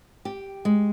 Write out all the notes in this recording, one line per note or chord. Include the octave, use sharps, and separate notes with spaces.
G4
G#3